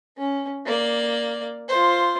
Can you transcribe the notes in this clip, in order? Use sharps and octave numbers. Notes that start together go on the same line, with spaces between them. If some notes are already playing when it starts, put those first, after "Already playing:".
C#4
A#3 D5
F4 C5